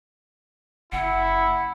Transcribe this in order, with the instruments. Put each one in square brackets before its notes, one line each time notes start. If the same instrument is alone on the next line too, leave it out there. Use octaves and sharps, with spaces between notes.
[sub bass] F#1 [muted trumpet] E4 [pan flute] F#5